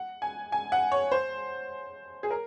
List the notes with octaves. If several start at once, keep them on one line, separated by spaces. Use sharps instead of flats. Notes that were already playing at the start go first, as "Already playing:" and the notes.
Already playing: F#5
G#5
G#5
F#5
C#5
C5
G#4
A#4